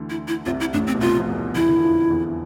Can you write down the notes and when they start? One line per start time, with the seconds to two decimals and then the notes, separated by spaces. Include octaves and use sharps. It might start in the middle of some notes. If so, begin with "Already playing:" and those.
Already playing: D2 D3 E3
0.10 E4
0.28 E4
0.46 C2 C3 F4
0.60 E4
0.73 A1 A2 D4
0.87 C4
0.95 B2
1.01 C2 C3 F4
1.19 F3
1.28 E2 E3
1.55 E2 E3 E4
1.69 D3
1.76 E3
1.82 F2 F3
2.10 E2 E3